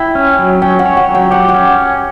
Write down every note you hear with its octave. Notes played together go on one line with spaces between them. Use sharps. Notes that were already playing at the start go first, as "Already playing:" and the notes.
Already playing: E4 G5
C#4
F#3
C#4 G5
F#5
C#5
F#5
F#3
G5
G4 F#5
F#5
C#4